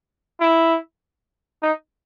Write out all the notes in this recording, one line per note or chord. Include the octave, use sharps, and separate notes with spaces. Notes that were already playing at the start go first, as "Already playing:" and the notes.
E4
D#4